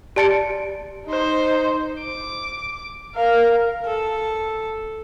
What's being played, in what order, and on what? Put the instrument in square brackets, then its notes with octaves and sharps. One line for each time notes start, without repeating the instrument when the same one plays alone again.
[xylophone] G4 D5 A5 A6 C#7 D7
[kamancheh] D#4 C5
D6
A#4 F5
A4